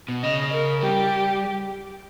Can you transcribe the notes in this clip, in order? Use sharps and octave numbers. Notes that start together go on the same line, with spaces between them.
B2
C#3 D#5
A#4
G3 G4